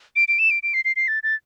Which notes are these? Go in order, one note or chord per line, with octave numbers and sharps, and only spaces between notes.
D7
D7
E7
D7
D7
C7
C7
C7
A6
A6